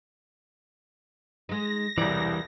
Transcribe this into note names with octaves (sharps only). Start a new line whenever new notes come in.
G#3 D#4 A#6
E1 C2 E3 G3 D5